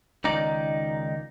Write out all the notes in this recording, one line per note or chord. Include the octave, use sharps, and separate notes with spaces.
C#2 D#3 D#4 D5